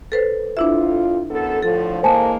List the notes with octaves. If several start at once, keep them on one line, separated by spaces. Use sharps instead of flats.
A4 B4 C5
F2 D4 E4 F4 E5
F#2 B3 A4
A2 D3 F3 A4
E3 G#3 A#3 C5 G#5 A5